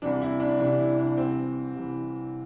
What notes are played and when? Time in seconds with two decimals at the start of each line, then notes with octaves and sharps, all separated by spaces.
0.02 C2 C3 E3 D4
0.22 E4
0.40 D4
0.59 C2 C3 E3 D4
0.79 E4
0.98 D4
1.17 C2 C3 E3 C4
1.75 C2 C3 E3